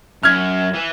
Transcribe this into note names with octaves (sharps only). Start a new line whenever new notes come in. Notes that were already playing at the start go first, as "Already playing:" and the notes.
F#2 F6 G#6
E3